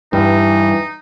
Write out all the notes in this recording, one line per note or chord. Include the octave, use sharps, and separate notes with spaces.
G2 E3 G3 D#4